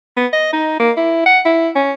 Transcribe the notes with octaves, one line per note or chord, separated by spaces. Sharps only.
B3
D#5
D#4
A#3
E4
F#5
E4
C#4